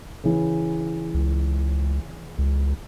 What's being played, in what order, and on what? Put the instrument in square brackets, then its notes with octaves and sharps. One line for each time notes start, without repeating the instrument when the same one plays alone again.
[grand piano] C#3 E3
[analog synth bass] C#2
C#2